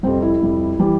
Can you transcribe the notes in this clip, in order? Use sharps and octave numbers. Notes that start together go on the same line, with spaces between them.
F2 C3 G3 C4
E4
F2 C3 G3
E3 G3